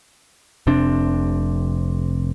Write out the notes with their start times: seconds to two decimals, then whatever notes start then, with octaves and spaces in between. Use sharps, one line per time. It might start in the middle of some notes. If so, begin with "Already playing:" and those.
0.67 F1 C3 C4 D4